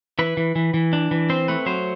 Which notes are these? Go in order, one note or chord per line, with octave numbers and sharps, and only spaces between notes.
E3 B4
E3
E3
E3
D4
E3
C4 C5
A3 B4
F#3 C5